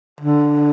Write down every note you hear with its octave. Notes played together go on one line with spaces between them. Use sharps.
D3